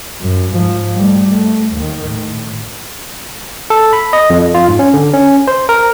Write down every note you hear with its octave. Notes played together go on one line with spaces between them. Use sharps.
F#2
G#2 F3
G3 A3
A3
D#2 D#3
A2
A4
B5
D#5
F2
F4
G#2
C#4
D3
C#4
C5
A#4